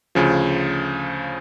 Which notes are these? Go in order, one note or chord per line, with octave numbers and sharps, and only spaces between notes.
D2 C#3 F3